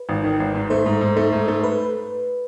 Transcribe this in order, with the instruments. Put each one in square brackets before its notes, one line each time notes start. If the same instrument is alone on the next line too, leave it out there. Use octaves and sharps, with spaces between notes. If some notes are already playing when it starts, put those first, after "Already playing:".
Already playing: [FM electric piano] B4
[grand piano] G#1
D#3
G#1
G#2
[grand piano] A3 [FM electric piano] C5
[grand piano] G#2
G#2
A3
G#2
A3
[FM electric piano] B4